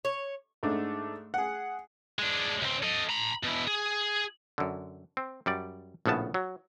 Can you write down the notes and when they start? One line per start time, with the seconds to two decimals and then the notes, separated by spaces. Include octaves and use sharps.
0.05 C#5
0.63 G#2 A3 D4
1.34 G#4 F#5
2.19 G#3 D4
2.62 C#2 C4
2.83 A4 D#5
3.09 A#5 B5
3.43 B2 E4
3.67 G#4
4.58 F#2 D3
5.17 C4
5.46 F#2 G3 D5
6.06 A#1 A2 C#3 B3 A5
6.34 F#3